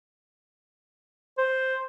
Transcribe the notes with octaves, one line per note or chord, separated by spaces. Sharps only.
C5